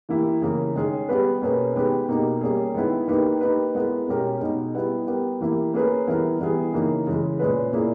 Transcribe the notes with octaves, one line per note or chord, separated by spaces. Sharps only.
E3 A#3 E4 G4
C#3 E3 A#3
D#3 G#3 C#4 G#4
G3 B3 G4 B4
B2 A#3 C#4 G#4 B4
D#3 G#3 B3 G4 B4
B2 A#3 D#4 G4
G3 A#3 C#4 G#4
D#3 G#3 B3 E4
D#3 A#3 D#4 G4 B4
A#3 D#4 G4 B4
G#3 B3 E4 A#4
B2 G#3 C#4 G4 A#4
B2 G#3 D#4
G3 B3 E4
G3 B3 G4 A#4
E3 A#3 E4 G4
A#3 C#4 G#4 B4
E3 G3 B3 E4 A#4
E3 G3 B3 E4 G#4
C#3 E3 A#3 D#4
C#3 E3 G#3
A#2 G#3 C#4 G#4 B4
A#2 A#3 E4 G#4